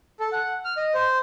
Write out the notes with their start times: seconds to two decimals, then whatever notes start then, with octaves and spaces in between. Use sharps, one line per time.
0.20 A4
0.32 F#5
0.65 F6
0.77 D#5
0.94 C5